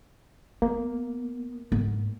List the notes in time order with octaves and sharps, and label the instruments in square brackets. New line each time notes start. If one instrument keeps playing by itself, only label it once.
[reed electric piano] A#3 [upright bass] B3
[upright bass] G#2